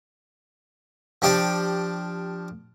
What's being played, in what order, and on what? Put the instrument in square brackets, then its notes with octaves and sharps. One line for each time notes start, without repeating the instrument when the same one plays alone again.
[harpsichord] F3 D4 G4 D5